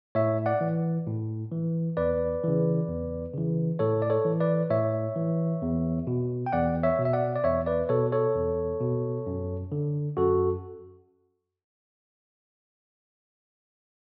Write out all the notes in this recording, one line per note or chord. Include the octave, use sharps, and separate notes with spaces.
A2 C#5 E5
D5 F#5
E3
A2
E3
E2 B4 D5
C#3 E3
E2
C#3 E3
A2 A4 C#5
D5
A4 C#5
E3
B4 D5
A2 C#5 E5
E3
E2
B2
G5
E2 D5 F#5
C#5 E5
B2
E5
D5 F#5
D5
E2 C#5 E5
B4 D5
B2 A4 C#5
A4 C#5
E2
B2
F#2
D3
F#2 F#4 A4